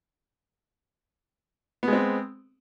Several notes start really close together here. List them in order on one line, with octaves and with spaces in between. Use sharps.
B3 G#3 C4